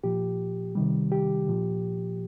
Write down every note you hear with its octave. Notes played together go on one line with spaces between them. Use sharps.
A#2 F3 G4
C3 D#3 G3
G4
A#2 F3